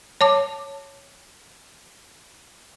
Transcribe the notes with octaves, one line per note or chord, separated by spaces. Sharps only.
C#5 A5 D6